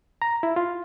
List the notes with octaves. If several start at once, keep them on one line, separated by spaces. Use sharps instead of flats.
A#5
E4
F4